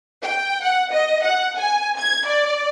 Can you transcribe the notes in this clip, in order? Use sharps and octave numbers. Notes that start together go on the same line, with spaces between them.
G5
F#5
D#5
F#5
G#5
G#6
D5